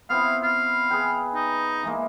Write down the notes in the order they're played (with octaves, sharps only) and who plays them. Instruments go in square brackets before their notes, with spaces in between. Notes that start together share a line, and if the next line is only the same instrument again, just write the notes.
[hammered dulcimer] B3 C4 E4 [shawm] F5
[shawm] F5
[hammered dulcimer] G#4 B4 G5
[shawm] D#4
[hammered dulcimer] E3 G#3 A#3